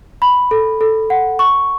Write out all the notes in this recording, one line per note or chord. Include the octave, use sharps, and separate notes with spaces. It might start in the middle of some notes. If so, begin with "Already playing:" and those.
B5
A4
A4
F#5
C#6